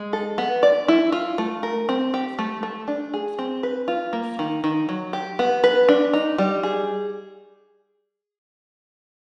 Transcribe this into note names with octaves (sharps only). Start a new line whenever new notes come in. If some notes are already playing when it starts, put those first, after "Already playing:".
Already playing: G#3
A4
B3
D5
E4
F4
A3
A#4
C4
G4
A3
A3
D4
G#4
C4
B4
F4
A#3
D#3
D#3
F#3
G4
B3
B4
D4
D#4
G3
G#4